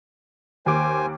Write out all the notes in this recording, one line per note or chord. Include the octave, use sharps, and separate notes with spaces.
D#2 C5 G#5 D6